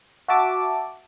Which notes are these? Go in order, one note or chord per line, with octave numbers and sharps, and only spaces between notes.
F#4 E5 A5 D6